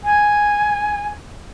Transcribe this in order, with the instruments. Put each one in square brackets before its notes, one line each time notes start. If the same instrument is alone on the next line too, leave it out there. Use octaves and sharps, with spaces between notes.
[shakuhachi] G#5